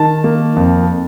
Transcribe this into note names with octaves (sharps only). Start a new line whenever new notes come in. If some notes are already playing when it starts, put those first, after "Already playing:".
Already playing: D#3 A5
A#3
F2